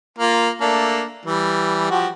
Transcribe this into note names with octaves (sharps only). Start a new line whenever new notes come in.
A#3 F4
A3 A#3 D4
E3 G3
F3 F#4 G4